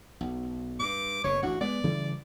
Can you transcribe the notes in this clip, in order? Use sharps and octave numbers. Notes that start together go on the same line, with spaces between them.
B1
G2 D6
F#1 B2 C#5
A1 D2 D4 F#4
G#3 B3 D5
C#3 E3 G3